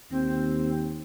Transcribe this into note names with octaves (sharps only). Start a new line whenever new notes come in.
D#2 C4